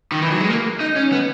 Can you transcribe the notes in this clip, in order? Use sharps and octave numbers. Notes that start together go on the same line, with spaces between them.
D#3
E3
F#3
G#3
A#3
D#4
C#4
B3